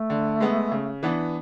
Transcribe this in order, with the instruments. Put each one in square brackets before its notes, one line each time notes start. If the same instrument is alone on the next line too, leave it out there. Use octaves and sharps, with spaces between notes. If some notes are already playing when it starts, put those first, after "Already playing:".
Already playing: [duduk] A3
[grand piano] D3
G#3 B3
C#3
E3 B3 D4